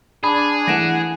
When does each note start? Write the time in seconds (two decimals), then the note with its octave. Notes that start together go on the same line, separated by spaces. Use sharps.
0.24 D4 G#4 B5
0.67 E3 A3 E4 F#5 A#6 D7 E7